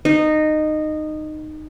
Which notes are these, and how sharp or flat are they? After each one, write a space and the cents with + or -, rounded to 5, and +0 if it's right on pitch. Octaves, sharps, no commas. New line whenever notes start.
D#4 -15